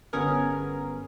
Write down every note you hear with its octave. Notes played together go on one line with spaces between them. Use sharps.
G1 B3 C#4 G#4 A#4